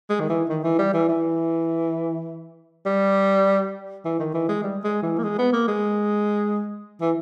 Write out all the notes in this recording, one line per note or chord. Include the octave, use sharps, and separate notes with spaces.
G#3
D#3
E3
D#3
E3
G3
E3
E3
G3
E3
D#3
E3
G#3
G3
G#3
E3
A#3
G#3
B3
A#3
G#3
E3